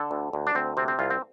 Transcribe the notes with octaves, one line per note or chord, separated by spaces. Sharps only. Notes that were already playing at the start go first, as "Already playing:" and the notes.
Already playing: D3 A4
D2
D2
D4
D2 C4
C3 C4
C4
C2 F4
C4